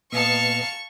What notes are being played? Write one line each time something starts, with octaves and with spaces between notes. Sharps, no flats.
A#2 B3 D#5 F5 A5 C#6 C#7